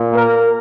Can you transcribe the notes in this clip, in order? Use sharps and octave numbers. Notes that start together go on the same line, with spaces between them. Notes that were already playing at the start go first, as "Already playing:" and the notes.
Already playing: A#2
A#3 A#4